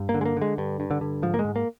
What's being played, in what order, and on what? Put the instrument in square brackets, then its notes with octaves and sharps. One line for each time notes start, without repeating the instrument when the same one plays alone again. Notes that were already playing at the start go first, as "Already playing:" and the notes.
Already playing: [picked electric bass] G2
A#3
D3
G#3
A#3
D3 G#3
G2
G2
D3
D3
G#2 F3
A#3
G#3
G#2
A#3